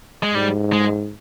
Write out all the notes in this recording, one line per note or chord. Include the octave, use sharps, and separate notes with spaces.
G#3
G#2 G3
G#3